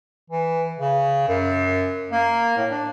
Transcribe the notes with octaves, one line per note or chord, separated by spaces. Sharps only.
E3
C#3
F#2
A#3
A2
D4